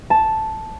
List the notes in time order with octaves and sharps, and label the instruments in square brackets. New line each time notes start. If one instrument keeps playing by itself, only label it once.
[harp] A5